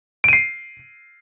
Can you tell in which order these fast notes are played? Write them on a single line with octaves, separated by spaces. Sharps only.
D7 D#7 C7